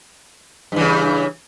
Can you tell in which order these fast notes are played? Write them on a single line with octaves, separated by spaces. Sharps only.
G2 E3 C#3